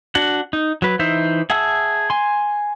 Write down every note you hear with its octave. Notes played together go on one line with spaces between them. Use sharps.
D4 F#4 F#5
D#4
F#3 B4
E3 D#4 C5 E5
G#4 E5 F#5 A5 E6
G#5 C6